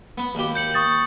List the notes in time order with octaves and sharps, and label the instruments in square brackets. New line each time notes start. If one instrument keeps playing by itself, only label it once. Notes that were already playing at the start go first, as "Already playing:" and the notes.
[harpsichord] B3
D#2 G4
[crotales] G6 C#7 F#7
[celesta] C#6 D#6 A6